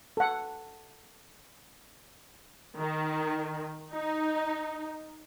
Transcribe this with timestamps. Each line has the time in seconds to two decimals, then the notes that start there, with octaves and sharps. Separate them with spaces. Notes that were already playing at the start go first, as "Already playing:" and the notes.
0.17 A4 F#5
2.77 D#3
3.95 D#4